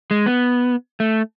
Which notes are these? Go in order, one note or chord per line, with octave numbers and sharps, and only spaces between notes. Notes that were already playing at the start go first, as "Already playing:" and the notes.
G#3
B3
A3